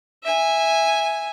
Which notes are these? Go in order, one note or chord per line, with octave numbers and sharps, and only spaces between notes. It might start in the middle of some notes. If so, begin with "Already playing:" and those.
E5 G#5